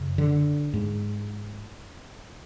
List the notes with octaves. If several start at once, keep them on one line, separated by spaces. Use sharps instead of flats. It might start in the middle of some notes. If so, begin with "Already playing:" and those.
Already playing: F#2 C#3
D3
G#2